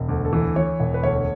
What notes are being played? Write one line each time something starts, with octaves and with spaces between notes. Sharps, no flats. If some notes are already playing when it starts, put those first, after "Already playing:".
Already playing: E1
D2
A4
E3
E3 C#5
E1
B4
D2 C#5